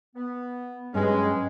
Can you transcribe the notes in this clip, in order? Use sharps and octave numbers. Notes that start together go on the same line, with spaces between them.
B3
G2 F#3 G#3 C#4 B4